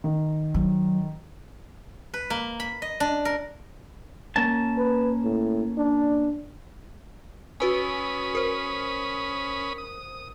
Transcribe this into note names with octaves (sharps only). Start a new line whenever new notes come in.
D#3
F#3
B4
A#3
B5
D#5
D4
A#4
A#3 C#4 A5
B4
A2
D4
C#4 F#4 B4 G#5 B5 D#6
A#4 C5
D#6